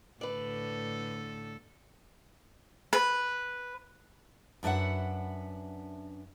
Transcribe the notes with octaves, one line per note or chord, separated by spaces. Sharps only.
A2 D3 A4 B4 D5
B4
F#2 D4 B4 E5 F#5